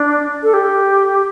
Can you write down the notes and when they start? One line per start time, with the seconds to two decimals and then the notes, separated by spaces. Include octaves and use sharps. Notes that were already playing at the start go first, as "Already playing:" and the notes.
Already playing: D4
0.43 A4
0.54 G4